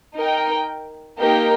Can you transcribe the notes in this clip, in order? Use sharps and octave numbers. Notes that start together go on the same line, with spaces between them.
D#4 A#4 G5
A#3 D#4 G4 A#4 G5